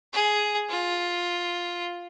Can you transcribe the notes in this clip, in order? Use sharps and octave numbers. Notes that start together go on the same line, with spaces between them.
G#4
F4